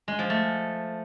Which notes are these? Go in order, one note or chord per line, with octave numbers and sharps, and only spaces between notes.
G#3
F3
A3